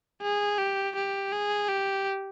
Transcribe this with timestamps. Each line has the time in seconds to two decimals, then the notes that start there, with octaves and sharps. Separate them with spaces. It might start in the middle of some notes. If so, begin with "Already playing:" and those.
0.22 G#4
0.59 G4
0.96 G4
1.32 G#4
1.69 G4